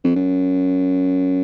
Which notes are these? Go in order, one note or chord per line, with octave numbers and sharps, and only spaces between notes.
F2
F#2